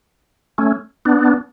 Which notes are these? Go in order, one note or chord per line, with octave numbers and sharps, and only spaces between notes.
A3 C#4
B3 D4